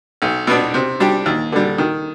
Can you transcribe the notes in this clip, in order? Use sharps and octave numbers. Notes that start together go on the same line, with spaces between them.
B1
B2 B3 D4
C3
G3 D4 G4
D#2
D3 G3
D#3